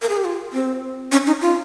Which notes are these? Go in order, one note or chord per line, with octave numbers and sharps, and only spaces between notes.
A#4
G#4
G4
F4
C4
C#4
D#4
F4